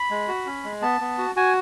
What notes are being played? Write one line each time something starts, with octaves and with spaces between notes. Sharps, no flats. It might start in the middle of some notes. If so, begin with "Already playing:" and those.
Already playing: B5
G#3
F#4
C#4
G#3
B3 A5
B3
F#4
F#4 G#5